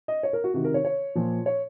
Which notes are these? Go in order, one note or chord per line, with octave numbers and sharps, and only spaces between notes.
D#5
C#5
A#4
F#4
C3 D#3 F#4
A#4
C#5
C#5
A#2 F3
C#5